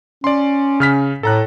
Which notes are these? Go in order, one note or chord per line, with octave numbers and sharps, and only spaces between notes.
C#4 D5 C6
C#3 F6 B6
A2 A4 A#5 F#6